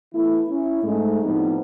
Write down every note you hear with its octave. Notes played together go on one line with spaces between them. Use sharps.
E3 A3 B3 E4
C#4 E4
G#2 G#3 A3
A2 F3 G3 B3 C4 D#4